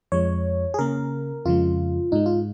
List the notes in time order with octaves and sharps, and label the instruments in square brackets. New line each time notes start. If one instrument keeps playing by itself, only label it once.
[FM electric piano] F2 F3 G#3 C#5
G#4
C#3 A#3 A#4
F2 C#3 F3 G#3 F4
G#2 G#3 D#4
F4